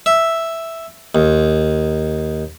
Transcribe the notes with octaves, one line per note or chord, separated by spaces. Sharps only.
E5
D#2